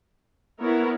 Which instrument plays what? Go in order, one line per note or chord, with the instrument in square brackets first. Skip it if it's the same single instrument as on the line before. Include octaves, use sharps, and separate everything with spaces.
[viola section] B3 E4 A#4 C#5